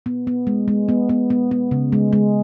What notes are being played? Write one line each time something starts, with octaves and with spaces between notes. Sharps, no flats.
B3
B3
G#3
G#3
B3
B3
B3
B3
C#3
G#3
G#3